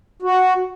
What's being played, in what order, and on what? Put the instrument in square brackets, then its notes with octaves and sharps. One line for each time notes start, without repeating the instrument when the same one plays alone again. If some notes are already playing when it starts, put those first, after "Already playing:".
[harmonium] F#4